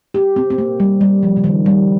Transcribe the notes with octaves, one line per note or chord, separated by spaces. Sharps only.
G4
C4
C4
A#3
G3
G3
F3
C#3
D#3
G3